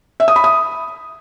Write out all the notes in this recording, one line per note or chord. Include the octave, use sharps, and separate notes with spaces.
E5
D#6
B5
D#6